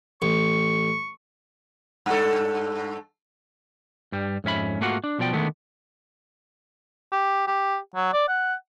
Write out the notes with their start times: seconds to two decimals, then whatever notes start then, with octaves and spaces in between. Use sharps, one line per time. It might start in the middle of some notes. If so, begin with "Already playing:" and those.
0.22 A1 C#6
2.06 G2 A4
4.12 G2 G3
4.44 F2 G#2 C#4 E5 B5
4.80 G#2 A3 A#3 F4 F#4 F#5
5.04 D4
5.19 B1 B2 F3 D5 G5
5.33 D3 D#3 G#3 A3 B3
7.12 G4
7.47 G4
7.95 F#3
8.13 D5
8.28 F#5